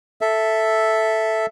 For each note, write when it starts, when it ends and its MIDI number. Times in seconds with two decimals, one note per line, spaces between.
0.21 1.46 69
0.21 1.46 76